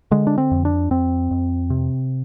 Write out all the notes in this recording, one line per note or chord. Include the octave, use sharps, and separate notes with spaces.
D3 G#3
D4
C4
F2
D4
F2 C4
F2
C3